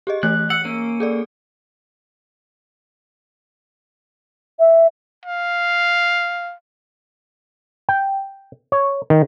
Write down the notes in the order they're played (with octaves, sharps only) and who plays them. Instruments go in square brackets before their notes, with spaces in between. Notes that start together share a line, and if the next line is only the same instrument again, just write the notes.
[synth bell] G4 G#4 D#5
[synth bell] E3 A3 C#5 [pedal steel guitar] F#6
[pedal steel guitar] F#5 [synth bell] E6
[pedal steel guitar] A#3 C#4
[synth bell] G#4 A4 D5
[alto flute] E5
[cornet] F5
[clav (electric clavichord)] G5
C#5
D#3